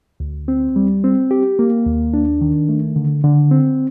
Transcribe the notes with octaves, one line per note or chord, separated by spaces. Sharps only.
D2
C4
G3
C4
G4
A#3
D#2
D4
D#3
A3
D3
D3
C4